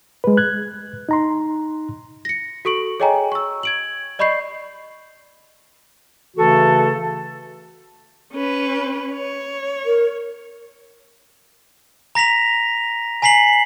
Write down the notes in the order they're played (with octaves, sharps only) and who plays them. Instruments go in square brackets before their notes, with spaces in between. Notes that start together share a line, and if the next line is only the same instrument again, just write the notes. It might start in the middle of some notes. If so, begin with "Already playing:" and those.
[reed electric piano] G#3 B4
F#6 G#6
D#4 A#5 C6
[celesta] A#6 C#7
F#4 A4 C#6 D7 F#7
G#4 C#5 D#5 G5 G#5 A#5
C#6 E6
G#6 D7 F#7
D5 D#5 B5 C#6 G6 C7
[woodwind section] C#3 E3 A3 F#4 A4
[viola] C#4 B4
C#5
[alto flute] A#4
[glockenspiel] A#5 A#6 B6 F7
G#5 A#5 B6 C7 F#7